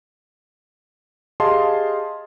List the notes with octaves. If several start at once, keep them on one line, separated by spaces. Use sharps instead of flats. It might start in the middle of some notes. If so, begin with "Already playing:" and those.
G4 G#4 D#5 F5 A5 C6